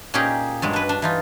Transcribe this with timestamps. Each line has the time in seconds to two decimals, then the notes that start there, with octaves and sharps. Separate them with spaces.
0.14 A#2 C#4 D#4 G4 G#4 A#5
0.62 G2 F#3 G#3
0.73 D4 B4
0.89 D4
1.02 E3 D#4 F4